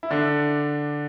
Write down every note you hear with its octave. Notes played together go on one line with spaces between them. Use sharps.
E4
D3 D4